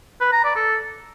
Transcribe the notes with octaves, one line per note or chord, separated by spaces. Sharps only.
B4
A#5
D5
A4